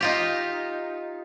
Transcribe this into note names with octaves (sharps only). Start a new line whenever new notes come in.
D#4 F4 G4